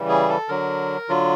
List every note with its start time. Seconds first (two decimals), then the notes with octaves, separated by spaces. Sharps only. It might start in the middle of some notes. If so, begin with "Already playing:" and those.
Already playing: C#3 E3 G3
0.09 G#4
0.29 A4
0.49 D3 F#3 A#4
1.09 D3 F#3 F4